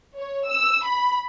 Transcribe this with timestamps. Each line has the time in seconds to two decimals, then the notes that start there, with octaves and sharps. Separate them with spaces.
0.17 C#5
0.49 E6
0.85 B5